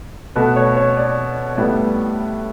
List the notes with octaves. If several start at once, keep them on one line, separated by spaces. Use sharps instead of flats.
B2 A3 B4
C#5
C#5
D5
A2 G3 B3 D5